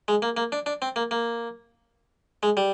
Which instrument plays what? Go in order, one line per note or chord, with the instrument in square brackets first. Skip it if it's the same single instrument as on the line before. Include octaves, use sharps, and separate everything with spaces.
[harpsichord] G#3
A#3
A#3
D4
D4
C4
A#3
A#3
G#3
G3